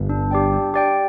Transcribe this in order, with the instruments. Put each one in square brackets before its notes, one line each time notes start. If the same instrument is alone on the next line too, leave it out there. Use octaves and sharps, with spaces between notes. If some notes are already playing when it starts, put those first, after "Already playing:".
Already playing: [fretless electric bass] G1 G2
[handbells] D4
G4 D5 G5
D4
G4 D5 G5